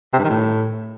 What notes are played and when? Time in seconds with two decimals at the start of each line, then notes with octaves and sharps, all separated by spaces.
0.13 C3
0.19 G2
0.24 D#3
0.30 A2